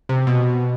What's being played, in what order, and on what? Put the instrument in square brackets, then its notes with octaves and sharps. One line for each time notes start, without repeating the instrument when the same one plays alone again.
[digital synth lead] C3
B2